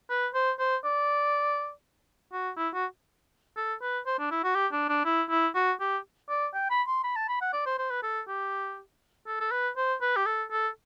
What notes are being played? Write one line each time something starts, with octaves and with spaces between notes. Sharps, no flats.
B4
C5
C5
D5
F#4
E4
F#4
A4
B4
C5
D4
E4
F#4
G4
D4
D4
E4
E4
F#4
G4
D5
G5
B5
C6
B5
A5
B5
F#5
D5
C5
C5
B4
A4
G4
A4
A4
B4
C5
B4
G4
A4
A4